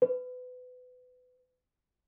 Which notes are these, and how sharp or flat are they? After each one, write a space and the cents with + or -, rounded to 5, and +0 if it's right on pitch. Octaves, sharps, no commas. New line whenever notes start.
B4 +25